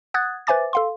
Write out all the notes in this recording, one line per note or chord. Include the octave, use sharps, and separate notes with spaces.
F#5 D#6 F#6 G#6 A6
B4 C5 E5 G#5 D6 A6
A4 F5 C6